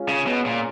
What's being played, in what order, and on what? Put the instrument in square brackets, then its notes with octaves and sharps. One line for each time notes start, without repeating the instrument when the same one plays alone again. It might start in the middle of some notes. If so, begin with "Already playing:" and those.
Already playing: [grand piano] G#3 C#4 F4
[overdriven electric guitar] C#3
B2
A#2